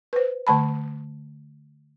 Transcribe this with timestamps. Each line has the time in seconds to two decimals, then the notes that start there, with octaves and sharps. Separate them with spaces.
0.13 B4 C5
0.47 D3 A3 A5 B5